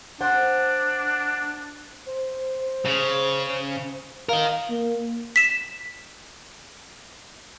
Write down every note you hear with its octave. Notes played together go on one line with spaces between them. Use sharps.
D4 C5 F#5
C5
C#3
A#4 D#5 F5
A#3
B6 E7